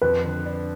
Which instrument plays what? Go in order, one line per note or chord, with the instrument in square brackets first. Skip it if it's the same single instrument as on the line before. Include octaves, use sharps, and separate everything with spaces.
[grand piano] F2 [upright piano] B4
[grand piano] D3
D4